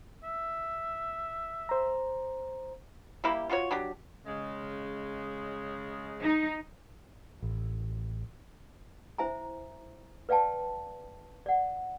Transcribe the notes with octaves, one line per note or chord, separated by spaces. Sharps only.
E5
C5 A#5
G3 A#3 E4 G4
F4 F#4 A#4 C#5
F#3 D4 G4
C#3 G#3
D#4
A1
E4 C5 E5 G#5 A#5
B4 D5 F5 G5 A5
D5 F#5